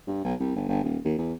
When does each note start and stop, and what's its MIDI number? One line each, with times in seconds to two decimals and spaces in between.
0.07 0.23 43
0.24 0.34 35
0.40 0.54 36
0.56 0.66 31
0.68 0.80 31
0.83 0.98 27
1.05 1.15 39
1.18 1.33 40